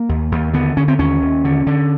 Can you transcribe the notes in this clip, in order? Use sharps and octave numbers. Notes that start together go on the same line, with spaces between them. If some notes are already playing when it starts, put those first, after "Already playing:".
Already playing: A#3
D#2
D#2
D3 B3
D3 C#4
C4
D#2 C#4
D#2
D3
D3